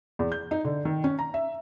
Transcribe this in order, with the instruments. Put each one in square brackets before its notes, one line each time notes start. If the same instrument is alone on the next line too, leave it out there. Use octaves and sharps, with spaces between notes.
[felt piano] E2
G6
D#4
D3
D#3
C#4
A#5
E5